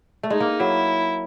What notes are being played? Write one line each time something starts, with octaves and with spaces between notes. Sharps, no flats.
A3
G#3 D#4
A#3
F#3 E4